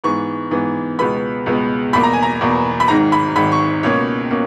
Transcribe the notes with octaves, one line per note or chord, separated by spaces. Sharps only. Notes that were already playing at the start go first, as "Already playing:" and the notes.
G#2 E3 B3 C#6
G#2 E3 B3
C#2 B2 G#3 B3 B5
C#2 B2 G#3 B3
E2 B2 A#3 B5
A#5
G#5
A#5
E2 B2 A#3
B5
G#1 G#2 D#3 A#5
B5
G#1 G#2 D#3 B5
C#6
C#2 B2 A#3 C#4 C#5
B2 A#3 C#4